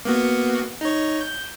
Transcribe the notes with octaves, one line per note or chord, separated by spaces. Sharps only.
A#3 B3 F#4
D#4 C#5
G6